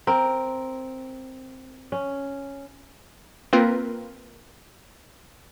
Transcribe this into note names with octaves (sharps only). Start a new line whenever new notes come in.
C4 A#4
C#4
A#3 C4 F4 A#4 B4